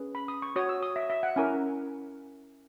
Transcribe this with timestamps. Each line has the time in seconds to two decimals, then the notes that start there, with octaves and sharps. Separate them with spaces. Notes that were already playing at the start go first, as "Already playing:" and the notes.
Already playing: C#4 G#4 B4
0.15 B5
0.28 D#6
0.42 C#6
0.56 F#4 C#5 D#6
0.69 E6
0.83 D#6
0.96 E5
1.10 E5
1.23 F#5
1.36 C#4 E4 A#4 G#5